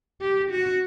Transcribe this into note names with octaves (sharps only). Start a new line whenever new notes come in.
G4
F#4